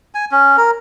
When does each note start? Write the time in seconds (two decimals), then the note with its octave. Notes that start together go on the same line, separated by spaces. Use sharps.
0.15 G#5
0.32 C#4
0.57 A#4